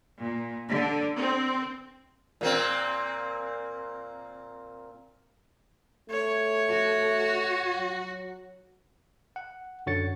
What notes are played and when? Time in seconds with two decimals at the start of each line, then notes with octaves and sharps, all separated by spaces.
0.21 A#2
0.72 D3
1.15 C4
2.41 A#2 A#3 C4
6.10 A3 C#5
6.70 F#4
7.78 F#3
9.36 F#5
9.86 F#2 D3 F#4 C#5 A6 C#7